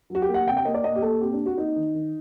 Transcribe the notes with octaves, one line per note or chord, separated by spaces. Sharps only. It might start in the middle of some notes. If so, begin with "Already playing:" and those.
F#3 F#4
G4
A#3
F#5
C3 G5
G5
A#3 D#5
D5
A#2 D#5
G4
A#2 A4
C4 G4
D4
C4
F#4
A#3 D#4
D#3
D#3